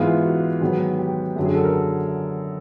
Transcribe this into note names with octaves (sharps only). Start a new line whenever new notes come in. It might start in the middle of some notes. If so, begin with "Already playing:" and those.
Already playing: G#2 E3 G#3 B3 F4
F#4
G#2 D#3 F#3 B3
G4
F#2 D3 F#3 G4
G#4
A4
A#4